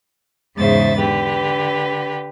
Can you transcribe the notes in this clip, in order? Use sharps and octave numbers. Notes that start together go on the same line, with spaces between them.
E2 G#2 C#3 C5 E5 A6
D3 G4 B4